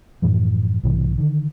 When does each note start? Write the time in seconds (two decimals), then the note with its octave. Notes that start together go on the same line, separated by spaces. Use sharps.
0.22 F#2 A2 E3 F3
0.83 B1 G#2 C3 E3
1.18 D3 D#3